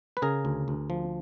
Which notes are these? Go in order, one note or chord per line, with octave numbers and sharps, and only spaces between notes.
B4
C#3 G#4 A#4
D2
D2
F3